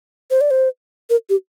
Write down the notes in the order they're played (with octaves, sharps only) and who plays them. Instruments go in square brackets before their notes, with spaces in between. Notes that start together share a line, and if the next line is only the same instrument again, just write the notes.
[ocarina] C5
D5
C5
A#4
G4